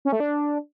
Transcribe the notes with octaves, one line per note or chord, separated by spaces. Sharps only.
C#4
A3
D4